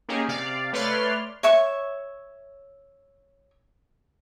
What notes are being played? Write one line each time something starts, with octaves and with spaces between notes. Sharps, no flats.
A#3 C#4 D#4 G4 G#4
C3 D5 F5
A3 B4 C#5 D5 C6 F6
C#5 E5 C#6